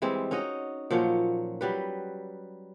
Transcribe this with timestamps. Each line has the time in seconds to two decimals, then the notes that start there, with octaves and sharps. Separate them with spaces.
0.02 E3 G3 G#3 C4
0.31 C#4 D#4 F#4 D#5
0.91 A#2 F3 F#3 C#4
1.61 F#3 G3 B4